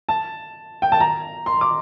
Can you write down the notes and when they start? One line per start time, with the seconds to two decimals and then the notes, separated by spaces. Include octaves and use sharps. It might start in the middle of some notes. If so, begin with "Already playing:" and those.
0.09 A5
0.82 G5
0.92 A5
1.00 A#5
1.46 C6
1.61 D6